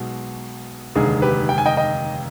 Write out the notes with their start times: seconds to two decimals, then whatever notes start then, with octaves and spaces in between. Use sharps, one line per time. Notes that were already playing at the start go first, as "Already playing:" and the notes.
Already playing: B1 B2 G#3 B3
0.95 F1 D#2 D3 G#3 G#4
1.22 G4 B4
1.49 G5
1.58 G#5
1.66 D#5 G5
1.77 D#5 G5